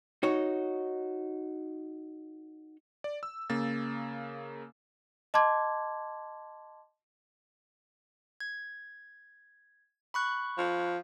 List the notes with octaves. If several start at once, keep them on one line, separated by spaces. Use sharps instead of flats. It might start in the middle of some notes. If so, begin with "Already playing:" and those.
D#4 F#4 C#5
D5
E6
C#3 A#3 A6
D#5 A5 C6 D6 G#6
G#6
B5 C#6 F#6
F3